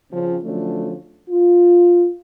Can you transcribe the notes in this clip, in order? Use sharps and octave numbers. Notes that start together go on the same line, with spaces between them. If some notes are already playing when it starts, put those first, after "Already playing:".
C#3 F3 C4
D3 F3 F#3 A3 C#4 D4
F4